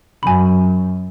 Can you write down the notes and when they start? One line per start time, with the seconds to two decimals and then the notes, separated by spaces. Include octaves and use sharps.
0.23 F#2 G#5 B5